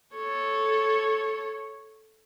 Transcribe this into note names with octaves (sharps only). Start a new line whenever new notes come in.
A4 C#5